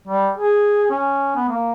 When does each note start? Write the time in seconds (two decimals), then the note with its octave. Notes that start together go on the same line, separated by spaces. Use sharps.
0.08 G3
0.38 G#4
0.90 C#4
1.36 B3
1.48 A#3